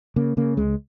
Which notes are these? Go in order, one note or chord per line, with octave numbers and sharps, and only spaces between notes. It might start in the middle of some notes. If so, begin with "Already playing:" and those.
C#3 A#3
C#3 A#3
C#2 G#3